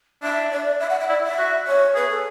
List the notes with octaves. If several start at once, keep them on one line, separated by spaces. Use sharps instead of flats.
D4 E5
D5
E5
F#5
E5
E4 D5
E5
F#4
C#5
G#4 B4
A4